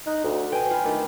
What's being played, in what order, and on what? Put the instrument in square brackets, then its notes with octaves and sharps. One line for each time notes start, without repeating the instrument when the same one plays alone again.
[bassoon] D#4 [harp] F#6
[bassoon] D2
[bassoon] B2 [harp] G5 G#5
[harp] F4 B5
[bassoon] D#3 [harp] A3 D4 F4